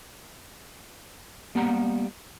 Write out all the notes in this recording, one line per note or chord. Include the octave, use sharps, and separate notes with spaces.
G3 A#3 B3 G4 F#5 A#5